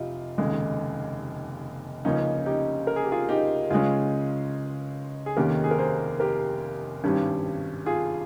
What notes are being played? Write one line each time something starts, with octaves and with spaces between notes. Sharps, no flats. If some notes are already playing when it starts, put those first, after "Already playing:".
Already playing: F1 D#4 F4 G4
F1 D#2 C#3 G#3
C#2 C#3 F3 A#3 C#4 D#4
D#4 G4
A#4
G#4
G4
F4 G#4
D#4 G4
C#2 C#3 G#3 C#4 F4 G#4
G#4
F1 D#2 D#3 A#3 C#4 G4 A#4
G#4
A#4
G#4 C5
G4 A#4
G#1 G2 G3 C#4
F4 G#4